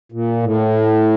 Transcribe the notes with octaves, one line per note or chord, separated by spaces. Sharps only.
A#2
A2